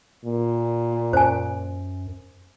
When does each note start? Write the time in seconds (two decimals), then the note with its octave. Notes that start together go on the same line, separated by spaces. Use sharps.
0.25 A#2
1.13 F#2 C5 G#5